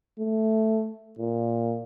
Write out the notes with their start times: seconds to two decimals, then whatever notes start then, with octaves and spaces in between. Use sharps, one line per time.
0.20 A3
1.19 A#2